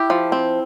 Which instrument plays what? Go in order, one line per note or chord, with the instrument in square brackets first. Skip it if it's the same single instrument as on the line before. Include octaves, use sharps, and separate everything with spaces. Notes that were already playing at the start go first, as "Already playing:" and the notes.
Already playing: [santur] E4 [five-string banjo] G4
[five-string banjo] F3
C4